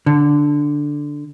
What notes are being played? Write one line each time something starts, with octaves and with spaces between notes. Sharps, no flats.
D3